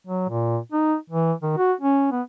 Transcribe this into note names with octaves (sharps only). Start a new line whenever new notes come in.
F#3
A#2
D#4
E3
D#3
F#4
C#4
B3